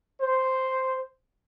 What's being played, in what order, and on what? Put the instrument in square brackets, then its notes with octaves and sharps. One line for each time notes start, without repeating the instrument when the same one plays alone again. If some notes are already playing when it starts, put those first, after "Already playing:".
[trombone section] C5